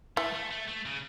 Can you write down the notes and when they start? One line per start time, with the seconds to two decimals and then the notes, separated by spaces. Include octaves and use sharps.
0.17 E3 A3
0.34 A3
0.51 A3
0.68 A3
0.86 C#3